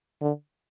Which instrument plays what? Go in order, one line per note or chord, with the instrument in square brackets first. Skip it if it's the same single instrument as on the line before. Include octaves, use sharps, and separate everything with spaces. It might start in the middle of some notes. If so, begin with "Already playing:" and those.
[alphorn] D3